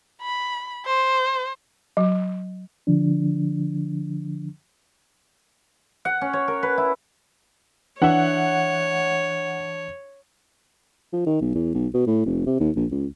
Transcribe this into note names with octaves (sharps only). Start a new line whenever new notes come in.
B5
C5
F#3
D3 F3 D4
F#5
C#4
C#5
A#4
B4
E4
E3 D4 C#5 E5 F#5
F3
D#3
B1
E2
B1
B2
A2
F1
C3
D#2
A#1
C#2